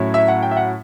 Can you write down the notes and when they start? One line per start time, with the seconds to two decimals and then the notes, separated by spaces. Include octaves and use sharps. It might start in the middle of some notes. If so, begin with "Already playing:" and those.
Already playing: A2 F#3 C#4 E4
0.14 E5
0.28 F#5
0.43 G5
0.51 E5
0.57 F#5